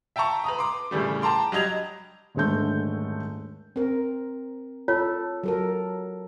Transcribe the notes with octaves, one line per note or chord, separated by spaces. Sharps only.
E5 G5 A5 A#5 C#6
B4 A#5 D#6
C6 D6
A1 C#3 E3 G3 A3
G5 A5 A#5 C6 D6
F#3 G3 D#5 G#6 F7
D#1 G#2 D3 A3 G6
C4 A#4
F4 A4 C#5
F#3 A4 A#4